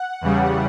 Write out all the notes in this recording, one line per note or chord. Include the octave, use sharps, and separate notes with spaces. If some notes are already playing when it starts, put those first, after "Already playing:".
Already playing: F#5
E2 C#3 G3